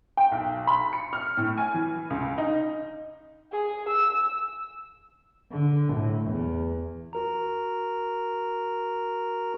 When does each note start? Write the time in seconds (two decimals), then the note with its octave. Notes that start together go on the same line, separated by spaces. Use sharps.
0.17 G5
0.32 B1
0.67 B5
0.93 C#7
1.13 F6
1.37 A2
1.57 G#5
1.74 E3
2.10 C#2
2.38 D#4
3.52 G#4
3.88 E6
5.52 D3
5.94 A2
6.30 E2
7.13 F#4 A#4 A#5